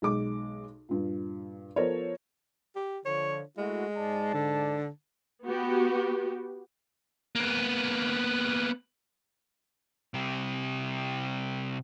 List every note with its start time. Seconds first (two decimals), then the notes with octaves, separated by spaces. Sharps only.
0.02 B1 G#3 D6
0.89 G2 A#2
1.76 F3 B3 A4 A#4 C5 C#5
2.76 G4
3.05 D3 F3 C#5
3.57 G#3 A3 E4 F#4
3.97 G#2 D5 A5
4.34 D3
5.45 B3 F#4 G4
7.35 A#3 B3
10.14 C3 G3